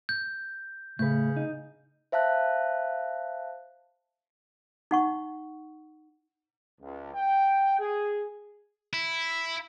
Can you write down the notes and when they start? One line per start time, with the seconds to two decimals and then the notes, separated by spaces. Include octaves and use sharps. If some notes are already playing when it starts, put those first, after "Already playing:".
0.09 G6
0.99 A2 C#3 B4 G6
1.37 D#4
2.12 C5 E5 F5 A5 F#6
4.91 D#4 F#5 C#6
6.80 C#2
7.13 G5
7.79 G#4
8.93 E4